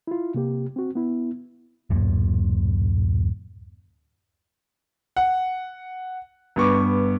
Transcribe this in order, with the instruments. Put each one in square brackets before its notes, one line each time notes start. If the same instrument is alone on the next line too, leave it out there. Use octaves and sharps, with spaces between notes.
[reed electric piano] E4 F4
C3 A#3 G4
C4 F#4
B3 E4
[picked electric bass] D1 F#2 A#2
[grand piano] F#5
G2 B3 C#6 D6